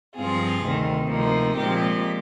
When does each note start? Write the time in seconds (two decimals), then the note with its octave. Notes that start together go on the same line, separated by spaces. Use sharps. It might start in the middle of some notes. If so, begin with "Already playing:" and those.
0.16 G2 F3 C4 F4 G#4
0.63 D2 C3 D#3
1.10 D2 C3 F3 A#3 D#4
1.57 A#2 F3 G#3 C4 G4